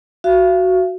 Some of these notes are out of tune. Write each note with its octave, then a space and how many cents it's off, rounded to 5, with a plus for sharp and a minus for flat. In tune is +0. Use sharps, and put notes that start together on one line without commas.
F#4 +0 F5 -40